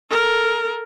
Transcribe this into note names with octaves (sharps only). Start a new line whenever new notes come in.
A4 A#4